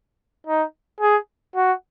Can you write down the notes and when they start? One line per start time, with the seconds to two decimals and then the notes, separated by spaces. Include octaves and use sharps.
0.47 D#4
1.01 G#4
1.56 F#4